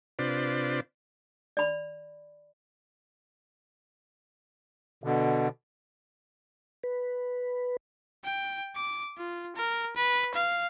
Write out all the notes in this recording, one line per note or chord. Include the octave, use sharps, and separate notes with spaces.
C3 D4 F4 B4 C5 D5
D5 B5
B2 D3
B4
G5
D6
F4
A#4
B4
F5